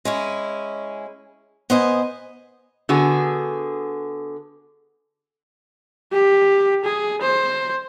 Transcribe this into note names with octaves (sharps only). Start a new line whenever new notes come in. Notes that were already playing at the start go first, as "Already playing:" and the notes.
G#3 C#4 E4
B3 C5 D#5 G#5
D3 B3 F#4 G#4
G4
G#4
C5